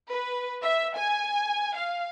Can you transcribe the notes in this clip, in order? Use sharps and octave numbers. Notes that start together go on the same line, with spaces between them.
B4
E5
G#5
F5